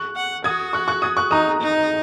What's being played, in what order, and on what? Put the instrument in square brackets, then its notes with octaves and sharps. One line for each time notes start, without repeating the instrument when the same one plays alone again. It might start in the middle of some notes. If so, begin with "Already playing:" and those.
Already playing: [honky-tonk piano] C#6 F#6
[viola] F#5
[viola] F#4 [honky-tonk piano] D#6 G#6
[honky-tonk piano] C#6 F#6
C#6 F#6
D#6 G#6
C#6 F#6
[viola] D#4 [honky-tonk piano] A#5 D#6
[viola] D#4